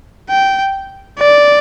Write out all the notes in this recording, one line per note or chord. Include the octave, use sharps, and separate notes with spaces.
G5
D5